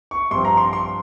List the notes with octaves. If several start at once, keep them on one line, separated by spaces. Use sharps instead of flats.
C#6
G2 F3 C4 C6
A#5
C6
C6